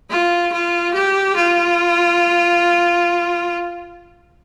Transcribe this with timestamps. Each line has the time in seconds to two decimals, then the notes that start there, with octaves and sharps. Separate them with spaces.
0.09 F4
0.52 F4
0.93 G4
1.36 F4